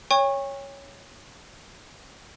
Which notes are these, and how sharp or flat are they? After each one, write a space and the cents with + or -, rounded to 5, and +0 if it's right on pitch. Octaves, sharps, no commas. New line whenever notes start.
C#5 +0 G5 +45 C#6 -20